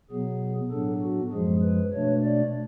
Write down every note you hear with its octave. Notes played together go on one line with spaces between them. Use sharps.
B2 F#3 B3 G#4
A2 F#3 B3 D4 A4
F#4
F#2 F3 G#3 G#4
B4
B2 A3 D4 C#5
D5